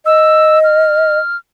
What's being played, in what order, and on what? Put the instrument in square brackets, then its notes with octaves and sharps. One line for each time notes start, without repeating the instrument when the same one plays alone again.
[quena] D#5 [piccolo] E6
[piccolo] F6